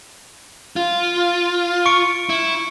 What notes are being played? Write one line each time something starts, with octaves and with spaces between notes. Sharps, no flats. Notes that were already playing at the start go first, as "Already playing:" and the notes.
F4
C#6 C#7 D7
E4